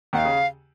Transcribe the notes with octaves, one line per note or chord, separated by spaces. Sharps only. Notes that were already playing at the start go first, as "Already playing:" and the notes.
D#2 D#3 F5 F#5
C#3